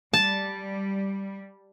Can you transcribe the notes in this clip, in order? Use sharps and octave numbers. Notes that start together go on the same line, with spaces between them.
G3 A5